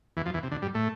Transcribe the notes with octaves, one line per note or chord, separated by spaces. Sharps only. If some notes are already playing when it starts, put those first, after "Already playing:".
E2 E3
F2 F3
E2 E3
C3
D2 D3
G2 G3
A2 A3